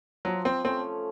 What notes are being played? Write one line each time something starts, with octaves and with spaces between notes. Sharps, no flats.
F3 F#3
C4
A3 C4 C#4